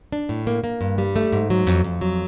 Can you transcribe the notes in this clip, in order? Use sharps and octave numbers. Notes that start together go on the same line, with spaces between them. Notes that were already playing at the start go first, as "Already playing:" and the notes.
D4
A2
A#3
A#3
G2
G3
A3
G#2
F#3
F2
F2
F#3